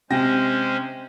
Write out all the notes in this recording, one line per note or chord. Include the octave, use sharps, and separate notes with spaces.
C3 G#3 C#4 C5 G5 A#6